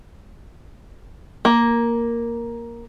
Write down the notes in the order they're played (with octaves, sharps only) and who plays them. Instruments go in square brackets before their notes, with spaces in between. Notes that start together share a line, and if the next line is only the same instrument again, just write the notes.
[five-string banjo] A#3